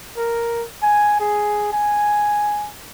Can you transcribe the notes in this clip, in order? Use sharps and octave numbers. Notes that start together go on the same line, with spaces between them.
A#4
G#5
G#4
G#5